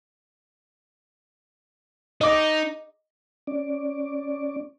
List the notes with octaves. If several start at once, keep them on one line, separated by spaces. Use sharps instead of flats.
D#4 D#5 D6
C#4 D5